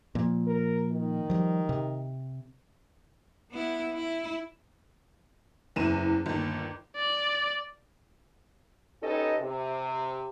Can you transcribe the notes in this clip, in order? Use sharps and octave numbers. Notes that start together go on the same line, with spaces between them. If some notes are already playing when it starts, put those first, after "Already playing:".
A#2 F3
A#4
D#3
F3 G3
C3
B3 E4
E4
F#1 E2 E3 D#7 E7
G1 D#2
D5
C#4 D#4 G4 A4 B4 D#5
C3